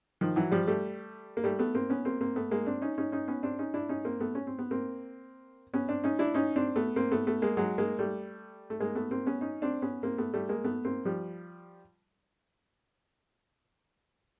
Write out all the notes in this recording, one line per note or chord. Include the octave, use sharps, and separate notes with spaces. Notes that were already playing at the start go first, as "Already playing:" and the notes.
D#3 F3
E3 F#3
F3 G3
G3 A3
A#3
G3 A3
A3 B3
A#3 C4
B3 C#4
A#3 C4
A#3 C4
A3 B3
G#3 A#3
C4 D4
C#4 D#4
C#4 D#4
C#4 D#4
B3 C#4
C4 D4
C#4 D#4
D4 E4
C#4 D#4
A#3 C4
A3 B3
C#4
C4
B3
A#3 C4
B3 C#4
C4 D4
C#4 D#4
D4 E4
C#4 D#4
C4 D4
A3 B3
A#3 C4
A3 B3
A3 B3
G#3 A#3
F#3 G#3
G#3 A#3
G3 A3
A3
G#3 A#3
A3 B3
A#3 C4
B3 C#4
C#4 D#4
C4 D4
B3 C#4
A#3 C4
A3 B3
G3 A3
G#3 A#3
A3 B3
A#3 C4
F3 G3